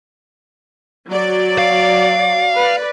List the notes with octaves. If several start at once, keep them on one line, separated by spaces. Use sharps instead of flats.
F#3 D5
F5
B4 D5